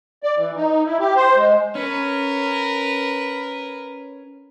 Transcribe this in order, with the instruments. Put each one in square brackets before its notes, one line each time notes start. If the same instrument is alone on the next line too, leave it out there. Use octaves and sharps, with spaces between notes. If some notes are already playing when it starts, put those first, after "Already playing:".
[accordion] D5
E3
D#4
E4
G4
C5
G#3
[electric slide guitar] C#4 [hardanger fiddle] A#4 B4